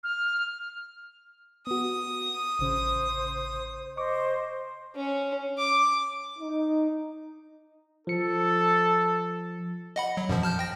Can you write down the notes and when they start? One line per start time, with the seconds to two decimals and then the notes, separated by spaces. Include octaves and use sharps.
0.04 F6
1.67 B3 F#4 D#6
2.59 A1 C#3 C5
3.97 C5 D#5 C#6 D6
4.95 C#4
5.58 D6
6.39 D#4
8.07 F3 A4 C#7
9.96 D#5 F#5 B5
10.17 F#3
10.29 F#2 B2 F3
10.43 A5 F6 G6
10.59 G5 A#6